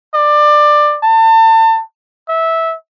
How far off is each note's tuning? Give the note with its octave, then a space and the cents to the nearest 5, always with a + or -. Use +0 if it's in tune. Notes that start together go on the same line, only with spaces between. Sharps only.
D5 +20
A5 +35
E5 -15